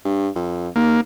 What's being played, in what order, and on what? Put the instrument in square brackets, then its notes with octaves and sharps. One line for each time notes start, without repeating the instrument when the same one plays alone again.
[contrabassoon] G2
F2
[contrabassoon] D#2 [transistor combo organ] A#3